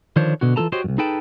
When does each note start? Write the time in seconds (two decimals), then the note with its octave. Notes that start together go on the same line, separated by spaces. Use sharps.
0.16 D3 D#3 F3 D4 C5 C#5
0.41 B2 D3 F#4
0.56 E3 A#3 F4 A4 A5 A#5
0.72 F#4 G4 C5 C#5 D#5
0.84 C2 F#2
0.98 D#4 G#4 A4 B4 G5 A5